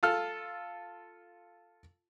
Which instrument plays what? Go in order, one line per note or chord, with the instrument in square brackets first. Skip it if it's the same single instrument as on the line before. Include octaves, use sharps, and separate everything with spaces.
[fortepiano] F4 A4 F6